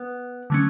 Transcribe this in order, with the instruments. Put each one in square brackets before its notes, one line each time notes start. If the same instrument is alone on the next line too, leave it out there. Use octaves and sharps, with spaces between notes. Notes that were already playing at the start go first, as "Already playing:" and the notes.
Already playing: [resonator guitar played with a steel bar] B3
[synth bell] D3 F#3 A3 C#4